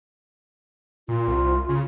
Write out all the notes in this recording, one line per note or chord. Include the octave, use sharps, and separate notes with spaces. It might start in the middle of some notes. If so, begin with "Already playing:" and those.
A#2 F4
C2
C#3